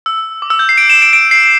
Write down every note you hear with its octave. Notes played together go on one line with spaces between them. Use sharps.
E6
D6
E6
G6
C7
D7
E7
D7
D7
C7